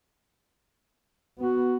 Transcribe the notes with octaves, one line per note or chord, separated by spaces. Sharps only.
B3 F#4